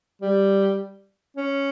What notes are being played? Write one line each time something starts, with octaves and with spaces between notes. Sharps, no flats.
G3
C#4